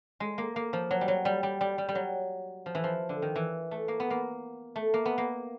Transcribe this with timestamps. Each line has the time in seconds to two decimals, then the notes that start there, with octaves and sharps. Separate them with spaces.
0.20 G#3
0.38 A#3
0.56 A#3
0.73 F3
0.91 F#3
1.01 G3
1.08 F#3
1.25 G3
1.43 G3
1.61 G3
1.78 G3
1.89 G3
1.95 F#3
2.66 F3
2.75 E3
2.84 F3
3.09 D3
3.22 D#3
3.36 E3
3.71 A3
3.88 A#3
4.00 B3
4.10 A#3
4.76 A3
4.94 A#3
5.05 B3
5.18 A#3